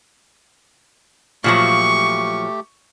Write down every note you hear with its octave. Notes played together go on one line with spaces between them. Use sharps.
A#2 F3 F#3 A3 G4 C#6